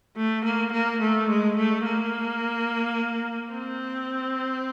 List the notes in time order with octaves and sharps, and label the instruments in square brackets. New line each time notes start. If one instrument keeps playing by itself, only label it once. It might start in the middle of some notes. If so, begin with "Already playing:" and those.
[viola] A3
A#3
A#3
A3
G#3
A3
A#3
C4